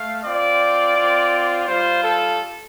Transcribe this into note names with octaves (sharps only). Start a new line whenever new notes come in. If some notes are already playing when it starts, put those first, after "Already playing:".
Already playing: A3 F5
C4 F4 D5
C4 F4
G3 F4 C5
A4